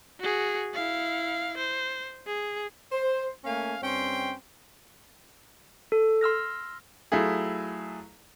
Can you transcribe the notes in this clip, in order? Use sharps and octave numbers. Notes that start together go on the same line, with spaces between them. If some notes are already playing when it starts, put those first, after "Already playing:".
F#4 G#4
E4 F5
C5
G#4
C5
A3 A#3 C#4 F5 G#5
G2 C4 C#4 G5 C6
A4
C6 E6 F6 A#6
F#3 A3 E4 F4 G#4